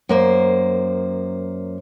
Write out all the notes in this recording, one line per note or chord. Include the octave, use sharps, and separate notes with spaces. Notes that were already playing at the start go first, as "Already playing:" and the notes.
F#2 A#3 C5